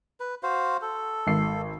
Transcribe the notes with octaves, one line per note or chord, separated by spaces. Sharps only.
B4
F#4 C5 F5
A4
G#1 C7